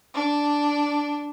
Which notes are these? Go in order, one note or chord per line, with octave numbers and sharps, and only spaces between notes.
D4